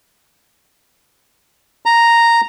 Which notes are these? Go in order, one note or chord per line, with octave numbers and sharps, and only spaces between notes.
A#5